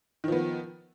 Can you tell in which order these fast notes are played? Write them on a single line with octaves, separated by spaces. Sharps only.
D#3 F3 B3